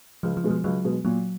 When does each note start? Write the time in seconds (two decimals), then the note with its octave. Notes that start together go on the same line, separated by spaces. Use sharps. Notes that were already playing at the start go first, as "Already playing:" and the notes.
0.23 C#2 F3
0.37 F3
0.44 B2 G#3
0.51 F3
0.64 C#2 F#3
0.85 B2 G#3
1.05 A#2 F#3